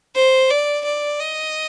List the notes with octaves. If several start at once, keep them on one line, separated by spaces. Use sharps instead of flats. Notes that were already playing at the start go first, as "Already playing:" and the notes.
C5
D5
D5
D#5